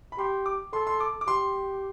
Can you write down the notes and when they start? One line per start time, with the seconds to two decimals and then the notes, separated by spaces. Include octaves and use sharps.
0.12 B5
0.18 G4 C6
0.46 D6
0.73 A4 C6
0.87 C6
1.00 D6
1.21 D6
1.27 G4 C6